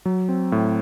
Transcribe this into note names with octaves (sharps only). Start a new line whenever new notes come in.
F#3
C4
A2